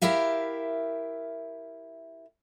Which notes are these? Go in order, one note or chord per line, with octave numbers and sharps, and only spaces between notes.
E4 G4 A#4 E5 F5